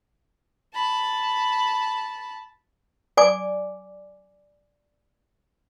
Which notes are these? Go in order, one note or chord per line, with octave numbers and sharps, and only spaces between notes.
A5 B5
D5 G#5 D6